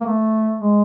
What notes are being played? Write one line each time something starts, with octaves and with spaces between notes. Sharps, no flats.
A#3
A3
G#3